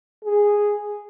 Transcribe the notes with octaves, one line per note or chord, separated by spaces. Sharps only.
G#4